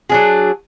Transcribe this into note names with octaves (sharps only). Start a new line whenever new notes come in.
F#3 D4 G#4